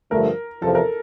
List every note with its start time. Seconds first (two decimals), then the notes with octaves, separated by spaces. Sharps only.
0.11 G2 D3 F3 A3 A#4
0.62 E2 C3 F3 A4
0.75 A#4